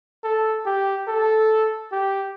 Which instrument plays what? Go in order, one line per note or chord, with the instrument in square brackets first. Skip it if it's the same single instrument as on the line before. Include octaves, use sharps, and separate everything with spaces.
[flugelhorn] A4
G4
A4
G4